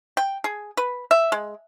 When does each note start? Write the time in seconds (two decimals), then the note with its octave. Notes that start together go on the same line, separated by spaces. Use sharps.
0.17 G5
0.44 G#4
0.77 B4
1.11 E5
1.32 G#3